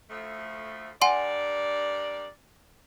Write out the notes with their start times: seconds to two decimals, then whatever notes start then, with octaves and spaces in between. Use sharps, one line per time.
0.10 D2 F3 A3
1.02 G2 A#4 D5 F#5 G#5 C6